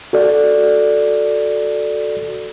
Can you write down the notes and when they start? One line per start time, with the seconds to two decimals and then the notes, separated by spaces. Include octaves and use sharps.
0.13 F#4 A4 D5